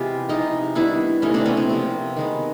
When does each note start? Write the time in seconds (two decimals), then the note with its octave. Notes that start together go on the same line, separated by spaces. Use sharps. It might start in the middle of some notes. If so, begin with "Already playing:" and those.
Already playing: C3 E3 G#3 B3 F4 G4
0.29 C3 F3 G#3 B3 D#4 F4
0.75 D#3 G3 B3 D4 E4
1.22 C3 E3 A3 C#4 D#4
1.34 C4 D4
1.45 B3 C#4
1.57 C4
1.69 C3 F3 A#3
2.16 D#3 G#3 B3